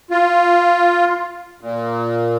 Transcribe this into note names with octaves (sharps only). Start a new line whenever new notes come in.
F4
A#2